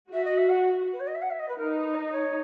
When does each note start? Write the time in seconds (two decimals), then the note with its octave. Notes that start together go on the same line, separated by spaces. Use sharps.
0.12 F#4 E5
0.25 D#5
0.37 E5
0.49 F#5
0.93 B4
1.00 C#5
1.07 D#5
1.15 E5
1.22 F#5
1.30 E5
1.39 D#5
1.48 B4
1.57 D#4 A#4
1.76 B4
1.94 D#5
2.12 C#5